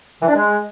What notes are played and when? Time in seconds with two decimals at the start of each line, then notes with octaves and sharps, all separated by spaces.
0.21 E3
0.27 D4
0.34 G#3